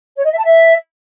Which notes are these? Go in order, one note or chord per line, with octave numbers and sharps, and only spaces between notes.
C#5
D#5
E5
A5
E5